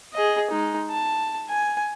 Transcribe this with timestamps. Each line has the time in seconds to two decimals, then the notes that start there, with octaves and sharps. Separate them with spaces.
0.14 G#4 D#5
0.50 G#3 D#4
0.90 A5
1.49 G#5